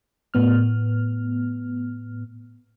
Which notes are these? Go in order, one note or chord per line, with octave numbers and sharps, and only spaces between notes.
A2 B3 F6